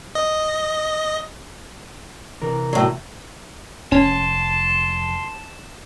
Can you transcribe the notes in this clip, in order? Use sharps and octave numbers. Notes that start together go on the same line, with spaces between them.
D#5
C3 E3 A#4
A2 F#3
F1 C#4 A5 C6